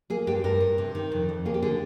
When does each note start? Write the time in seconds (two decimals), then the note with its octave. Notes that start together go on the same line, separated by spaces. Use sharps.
0.10 A#3 G#4
0.27 G2 G4
0.44 G2 A#4
0.60 G2
0.78 C3
0.95 D#3
1.12 F2
1.29 F2
1.45 A#3 G#4
1.54 G4
1.62 D3 G#4